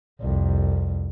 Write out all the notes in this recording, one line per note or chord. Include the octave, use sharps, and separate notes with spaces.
C2 F2